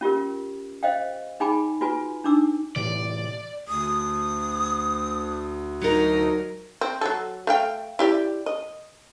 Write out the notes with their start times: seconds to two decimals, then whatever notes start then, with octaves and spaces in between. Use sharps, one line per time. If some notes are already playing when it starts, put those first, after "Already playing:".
0.01 C#4 F4 G4 A#4
0.83 C5 D#5 F5 G5
1.40 D#4 G#4 G5 G#5 B5 D6
1.81 F4 F#4 B4 G#5
2.24 D4 D#4 D6 E6
2.76 A2 C3 E3 D5
3.68 D2 D#6
5.82 F#3 D#4 A#4
6.81 C4
7.01 F#3 A4
7.47 A3 F5 G5
7.99 E4 G4 D5
8.46 D#5